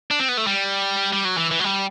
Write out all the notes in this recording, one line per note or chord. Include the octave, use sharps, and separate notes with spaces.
D4
C4
B3
A3
G3
G3
F#3
E3
E3
F#3
G3